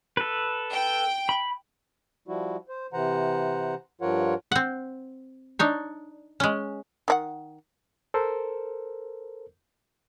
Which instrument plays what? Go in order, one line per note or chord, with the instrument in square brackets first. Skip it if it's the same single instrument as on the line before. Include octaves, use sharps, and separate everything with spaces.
[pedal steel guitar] A4 B4
[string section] G5
[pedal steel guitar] B5
[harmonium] F3 G3 E4 F#4
C5
C3 E3 C5 F#5 A#5
G2 F3 F4 A#4 C#5 F#5
[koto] C4 F#5
D4 D#4 C#5
G#3 C#4
[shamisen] D#3 D4 F#5
[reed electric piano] A4 A#4 C5